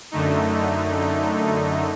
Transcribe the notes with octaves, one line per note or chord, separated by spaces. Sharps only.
F#2 D3 A3 D#4